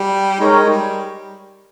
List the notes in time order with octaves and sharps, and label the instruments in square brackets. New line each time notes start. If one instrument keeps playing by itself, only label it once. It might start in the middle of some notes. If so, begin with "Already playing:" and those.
Already playing: [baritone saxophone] G3
[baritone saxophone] G#3 [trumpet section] D#4 A#4 C#5 G5
[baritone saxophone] G3